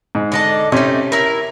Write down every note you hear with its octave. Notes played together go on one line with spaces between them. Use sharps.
G#2
D3 D#5 A5
C3 A3 C#4 D#4
E4 A#4